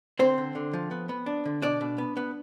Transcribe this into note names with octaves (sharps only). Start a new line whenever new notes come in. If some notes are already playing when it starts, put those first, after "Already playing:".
D3 C4 C5
D3
D3
F3
B3
B3
D4
D3
B2 D4 D5
B2
B3
B3